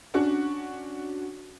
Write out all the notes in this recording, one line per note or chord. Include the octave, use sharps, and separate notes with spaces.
C#4 D4 F#4